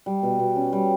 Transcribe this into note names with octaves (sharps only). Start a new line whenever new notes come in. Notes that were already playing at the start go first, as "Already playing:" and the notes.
G3
B2
B2
C#4
G3